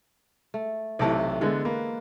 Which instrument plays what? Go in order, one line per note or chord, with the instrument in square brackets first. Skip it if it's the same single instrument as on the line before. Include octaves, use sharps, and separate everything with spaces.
[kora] A3
[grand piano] B1 C3 A5 [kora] E3 A3 D5
[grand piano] D3 B3 [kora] G#3 A4
[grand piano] A#3 [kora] B4